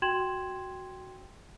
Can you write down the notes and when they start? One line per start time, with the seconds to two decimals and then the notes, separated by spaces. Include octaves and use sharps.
0.02 F#4 G5 C6 G#6 E7 F#7